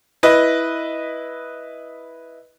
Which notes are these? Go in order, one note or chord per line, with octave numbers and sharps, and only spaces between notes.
E4 B4 D#5